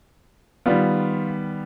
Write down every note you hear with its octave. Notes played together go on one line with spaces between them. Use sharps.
D#3 G3 B3 F4